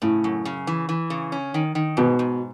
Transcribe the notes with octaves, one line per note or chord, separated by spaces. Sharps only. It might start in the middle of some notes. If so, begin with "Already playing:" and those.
A2 C#3
F#2
C#3
E3
E3
C#3
C#4
D#3
D#3
G#2 B2
G#2